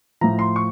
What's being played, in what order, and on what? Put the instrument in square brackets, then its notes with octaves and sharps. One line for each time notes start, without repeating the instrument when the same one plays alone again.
[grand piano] A2 F3 A#5
C6
C#6